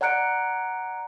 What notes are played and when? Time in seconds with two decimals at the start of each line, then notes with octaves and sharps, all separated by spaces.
0.01 D5 F#5 A#5 F#6 C#7 D7